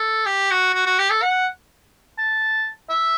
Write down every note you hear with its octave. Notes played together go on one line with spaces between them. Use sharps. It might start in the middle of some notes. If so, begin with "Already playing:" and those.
Already playing: A4
G4
F#4
F#4
F#4
G4
A4
F#5
A5
E5